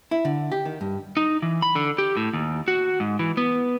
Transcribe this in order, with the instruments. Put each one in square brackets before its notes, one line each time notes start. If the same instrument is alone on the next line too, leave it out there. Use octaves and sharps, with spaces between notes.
[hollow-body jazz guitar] E4
D3
G4
D#3
G2
[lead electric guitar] D#4
E3
B5
D3
G4
A2
D#2
F#4
G#2
E3
B3